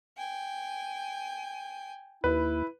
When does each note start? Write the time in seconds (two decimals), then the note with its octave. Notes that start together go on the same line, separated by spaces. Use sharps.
0.18 G5 G#5
2.24 D#2 E4 B4